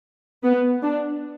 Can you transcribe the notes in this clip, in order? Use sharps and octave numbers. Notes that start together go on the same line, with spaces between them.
B3
D4